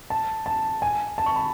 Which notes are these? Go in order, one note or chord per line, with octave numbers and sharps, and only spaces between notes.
A5
A5
G#5
A5
C#6
B5